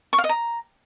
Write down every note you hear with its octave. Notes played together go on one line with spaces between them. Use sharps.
C#6
F5
D#5
A#5